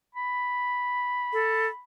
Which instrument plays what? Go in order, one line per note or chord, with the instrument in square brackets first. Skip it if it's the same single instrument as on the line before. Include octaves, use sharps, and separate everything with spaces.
[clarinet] B5
[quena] A4